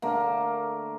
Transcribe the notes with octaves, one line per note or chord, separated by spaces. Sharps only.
D3 A3 A#3 A#4